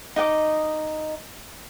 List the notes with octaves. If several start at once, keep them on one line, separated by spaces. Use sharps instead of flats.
D#4 D#5 F#5 D6